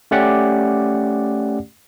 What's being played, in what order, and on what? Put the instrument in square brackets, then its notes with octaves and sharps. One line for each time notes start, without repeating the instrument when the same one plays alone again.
[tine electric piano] A3 C#4 G4 D5 F#5